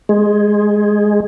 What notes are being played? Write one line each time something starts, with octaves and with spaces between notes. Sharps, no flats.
G#3